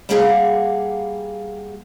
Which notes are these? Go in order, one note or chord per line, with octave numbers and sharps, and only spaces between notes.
G3 A#3 G4 G#4 F5 F#5